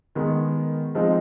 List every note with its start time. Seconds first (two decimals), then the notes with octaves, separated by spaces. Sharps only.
0.15 D#3 G#3 B3
0.95 F3 G#3 C4 D#4